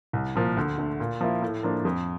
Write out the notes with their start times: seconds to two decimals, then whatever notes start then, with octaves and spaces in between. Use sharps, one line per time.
0.13 C2
0.35 A#2 F3 A#3
0.57 D2
0.78 D3 A3
1.00 A#2
1.21 F3 A#3 E4
1.42 A2
1.63 F3 A#3 D4
1.85 F2